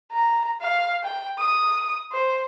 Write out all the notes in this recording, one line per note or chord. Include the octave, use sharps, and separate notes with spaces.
A#5
F5
G5
D#6
C5